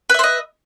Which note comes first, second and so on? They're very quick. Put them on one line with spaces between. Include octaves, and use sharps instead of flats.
B4 E5 C5 D#5